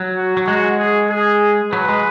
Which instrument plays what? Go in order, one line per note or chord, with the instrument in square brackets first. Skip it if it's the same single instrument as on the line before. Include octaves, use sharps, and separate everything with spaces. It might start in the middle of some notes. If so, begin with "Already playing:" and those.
Already playing: [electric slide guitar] F#3
[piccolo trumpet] F#4
[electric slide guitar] F#3
[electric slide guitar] G#3 [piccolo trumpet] F#4
[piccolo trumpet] G#4
G#4
[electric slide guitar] F#3 [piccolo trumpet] B4
[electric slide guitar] G#3